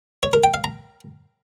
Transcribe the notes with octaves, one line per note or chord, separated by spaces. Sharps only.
C#5
A#4
G5
F5
A#5